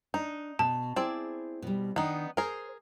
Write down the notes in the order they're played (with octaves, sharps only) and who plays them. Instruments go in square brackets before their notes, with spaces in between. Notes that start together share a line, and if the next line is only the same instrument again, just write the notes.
[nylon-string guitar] D4 [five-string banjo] D#4
[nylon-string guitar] B2 [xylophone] A5
[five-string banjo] C4 D5 [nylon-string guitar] E4 G#4
[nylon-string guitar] B2 G3
[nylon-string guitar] D#3 D4 [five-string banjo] B3 D#4
[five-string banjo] G#4 A#4 [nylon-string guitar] C5